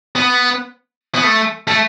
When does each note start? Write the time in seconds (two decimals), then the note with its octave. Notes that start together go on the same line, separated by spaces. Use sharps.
0.16 B3
1.15 B3
1.24 A3
1.68 A3